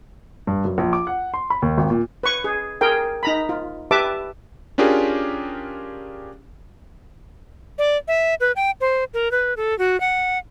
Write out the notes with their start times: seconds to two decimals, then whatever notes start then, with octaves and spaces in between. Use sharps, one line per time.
0.47 G2
0.65 F#2
0.78 A#1
0.93 D6
1.07 F#5
1.34 C6
1.50 B5
1.62 D#2
1.78 G#1
1.90 A#2
2.23 B4 C#6
2.44 G#4
2.81 G#4 A#4 G5
3.23 D#4 A#5 B5
3.49 F4
3.91 G4 B4 E5 A5 D6
4.78 C#4 D4 F4 G4 G#4 A#4
7.78 D5
8.08 E5
8.40 B4
8.56 G5
8.81 C5
9.14 A#4
9.32 B4
9.57 A4
9.79 F#4
10.00 F#5